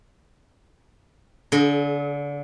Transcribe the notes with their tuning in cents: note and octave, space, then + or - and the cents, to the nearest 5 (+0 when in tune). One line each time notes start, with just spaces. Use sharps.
D3 -30 G#4 +45 D#5 +0